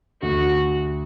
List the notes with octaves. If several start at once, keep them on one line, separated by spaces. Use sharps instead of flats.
D2 F#4